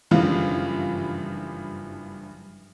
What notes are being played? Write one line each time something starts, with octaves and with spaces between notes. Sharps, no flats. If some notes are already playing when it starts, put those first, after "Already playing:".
F#1 G2 E3 F3 F5